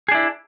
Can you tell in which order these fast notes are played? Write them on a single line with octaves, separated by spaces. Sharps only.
G#4 D4 E4